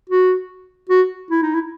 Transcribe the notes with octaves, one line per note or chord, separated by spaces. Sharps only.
F#4
F#4
E4
D#4
E4